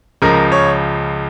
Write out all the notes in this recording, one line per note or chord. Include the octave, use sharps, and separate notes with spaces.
C#2 C#3 F3 A#4
C#5